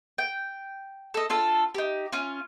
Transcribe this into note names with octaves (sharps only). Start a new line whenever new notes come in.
G5
A4 D#5
D4 F4 A4
D#4 G4
C#4 F4